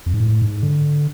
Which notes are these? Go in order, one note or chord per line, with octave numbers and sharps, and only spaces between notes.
F2
G#2
A2
G#2
D3